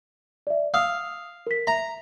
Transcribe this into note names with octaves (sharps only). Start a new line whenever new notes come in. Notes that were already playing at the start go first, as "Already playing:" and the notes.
D5 E5
F5 D#6 E6
A#4 B6
E5 A#5